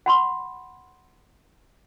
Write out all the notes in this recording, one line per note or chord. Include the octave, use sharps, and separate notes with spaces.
F#5 B5 C6